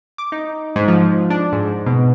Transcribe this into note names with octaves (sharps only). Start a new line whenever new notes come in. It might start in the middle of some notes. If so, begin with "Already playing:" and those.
D6
D#4
G#2
F3
D4
G#2
B2